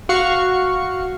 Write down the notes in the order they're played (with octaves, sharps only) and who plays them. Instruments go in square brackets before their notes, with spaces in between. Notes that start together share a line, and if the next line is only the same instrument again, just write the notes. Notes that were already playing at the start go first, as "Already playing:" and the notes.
[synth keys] F#4 F5 C#6